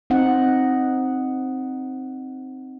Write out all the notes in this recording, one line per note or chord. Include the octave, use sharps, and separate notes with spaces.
C4 D#4 F#5